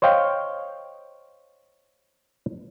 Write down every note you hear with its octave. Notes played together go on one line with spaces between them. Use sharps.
C5 C#5 D#5 F5 G5